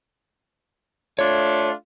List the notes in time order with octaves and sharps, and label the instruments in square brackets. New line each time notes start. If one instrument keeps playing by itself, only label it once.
[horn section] A3 D4 F4 [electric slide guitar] C#5